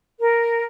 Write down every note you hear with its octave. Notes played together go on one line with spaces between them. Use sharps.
A#4